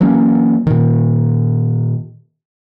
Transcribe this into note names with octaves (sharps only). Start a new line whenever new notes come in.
E3 F#3 A#3 C#4
A#2 D#3